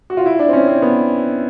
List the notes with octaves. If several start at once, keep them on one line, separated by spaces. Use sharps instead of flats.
F#4
F4
E4
D4
C4
C#4
C4
B3